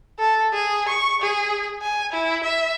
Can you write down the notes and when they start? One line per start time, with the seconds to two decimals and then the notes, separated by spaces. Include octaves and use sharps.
0.19 A4
0.53 G#4
0.88 C#6
1.22 G#4
1.82 G#5
2.13 E4
2.44 E5